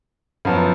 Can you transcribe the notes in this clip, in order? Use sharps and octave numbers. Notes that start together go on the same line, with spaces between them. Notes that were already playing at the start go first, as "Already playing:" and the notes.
F#2 F3 B3